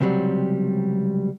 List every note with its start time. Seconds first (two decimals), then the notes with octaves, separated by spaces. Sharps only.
0.01 C#2 C3 F#3 G3